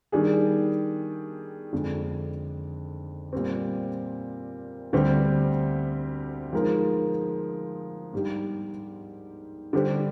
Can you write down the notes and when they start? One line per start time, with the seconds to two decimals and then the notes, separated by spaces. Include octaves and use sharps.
0.12 D#3 G3 D4 G#4
1.73 F2 D3 G#3 D4
3.33 A#2 G3 C4
4.93 D2 D3 G3 C4 G4
6.53 F3 G#3 D#4 A#4
8.13 G#2 G3 D4 G4
9.73 D3 G3 D4 G4 C5